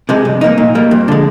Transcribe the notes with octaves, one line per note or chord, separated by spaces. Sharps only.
C3 F3 G#3
G2
F3 A#3 D#4
A#2
G3 A#3
F2
D3 G#3